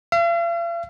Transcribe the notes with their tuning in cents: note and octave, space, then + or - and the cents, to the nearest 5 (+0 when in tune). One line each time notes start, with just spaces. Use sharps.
F5 -45